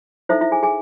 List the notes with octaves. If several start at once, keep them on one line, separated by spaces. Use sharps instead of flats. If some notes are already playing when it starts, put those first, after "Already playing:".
D#4 E4 A4 C5 E5
E4 E5
G#4 G#5
G#4 G#5